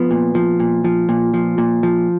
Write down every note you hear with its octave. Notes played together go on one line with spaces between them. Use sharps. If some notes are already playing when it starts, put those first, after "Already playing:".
Already playing: F3 B3
A#2
F3
A#2
F3
A#2
F3
A#2
F3